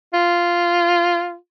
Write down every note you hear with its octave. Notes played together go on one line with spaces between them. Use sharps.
F4